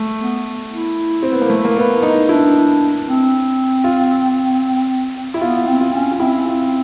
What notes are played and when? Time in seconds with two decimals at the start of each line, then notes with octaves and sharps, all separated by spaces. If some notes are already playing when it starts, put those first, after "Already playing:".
Already playing: A3
0.20 B3
0.72 E4
1.23 C4
1.32 B3
1.42 A#3
1.50 A3
1.65 A#3
1.77 B3
2.02 D#4
2.28 D4 E4
3.06 C4
3.84 F4
5.34 E4
5.41 B3 F4
5.67 C4
5.81 F4
5.93 C#4
6.11 F4
6.19 C4 E4
6.45 F4